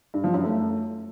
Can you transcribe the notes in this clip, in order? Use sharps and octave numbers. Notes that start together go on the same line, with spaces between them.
G2
F3
F#2
A3